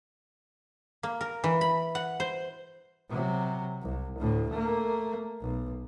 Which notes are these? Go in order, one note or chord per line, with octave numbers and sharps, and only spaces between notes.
A#3
A#4
E3
B5
F#5
C5
C3 F#3
C2
D2 A2
A3 A#3
B1